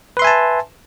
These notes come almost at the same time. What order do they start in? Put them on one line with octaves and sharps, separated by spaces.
B4 C6 E5 G#5 A5